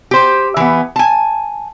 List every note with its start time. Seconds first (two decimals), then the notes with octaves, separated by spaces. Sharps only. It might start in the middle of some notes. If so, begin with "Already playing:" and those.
0.11 G4 C5
0.57 E3 B3
0.96 G#5 A5